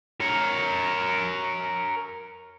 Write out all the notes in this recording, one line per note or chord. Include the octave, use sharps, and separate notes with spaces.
A#4 C#5